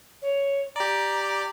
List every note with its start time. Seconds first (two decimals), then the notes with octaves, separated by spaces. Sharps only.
0.22 C#5
0.76 G4 D5 A#5